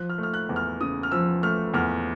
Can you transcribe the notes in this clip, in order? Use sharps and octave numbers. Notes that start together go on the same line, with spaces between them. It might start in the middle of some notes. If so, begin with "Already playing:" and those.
Already playing: F3 F#6
F6
A3
F6
F#6
E2
F6
C#3 D#6
F6
F3 E6
A3 F6
E2 F6